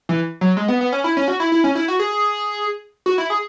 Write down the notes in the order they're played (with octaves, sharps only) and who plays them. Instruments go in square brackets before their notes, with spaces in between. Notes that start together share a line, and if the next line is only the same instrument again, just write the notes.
[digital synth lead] E3
F#3
G#3
B3
B3
C#4
E4
C#4
F#4
E4
E4
C#4
E4
F#4
G#4
F#4
E4
G#4